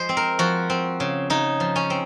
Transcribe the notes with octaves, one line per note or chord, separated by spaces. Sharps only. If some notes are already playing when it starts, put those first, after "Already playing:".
Already playing: F3 G#3 C5
C4
A#4
F3 F#4
C4
C#3
C#3 D#4
F3
C#4
C4